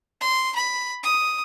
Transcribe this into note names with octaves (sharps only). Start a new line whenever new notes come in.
C6
B5
D#6